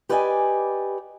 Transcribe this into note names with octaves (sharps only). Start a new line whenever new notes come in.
G4 B4 D5 D#5 F#5 G#5